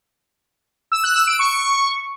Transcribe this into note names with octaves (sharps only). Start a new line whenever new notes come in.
E6
F#6
E6
D7
C#6